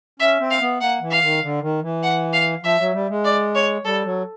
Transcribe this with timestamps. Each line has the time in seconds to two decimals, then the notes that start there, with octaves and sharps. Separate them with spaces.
0.20 C#4 E5
0.40 C4
0.50 F5
0.60 B3
0.81 A#3 F#5
1.01 E3
1.10 F5
1.22 D#3
1.42 D3
1.62 D#3
1.82 E3
2.03 F#5
2.33 F5
2.63 F3 E5
2.78 F#3
2.94 G3
3.09 G#3
3.24 D5
3.55 C#5
3.85 G3 A4
4.05 F#3